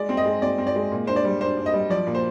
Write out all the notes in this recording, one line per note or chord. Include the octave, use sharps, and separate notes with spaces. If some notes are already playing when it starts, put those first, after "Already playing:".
Already playing: G#3 D5
C4
D#5
G#3
C4 D5
C4
D5
G#3
A#2
D4 C5
D5
G3
D4 C5
D4
D#5
G3
F3 D5
A#2
C5